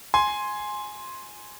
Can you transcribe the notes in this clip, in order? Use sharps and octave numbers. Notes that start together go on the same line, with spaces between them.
G#5 C6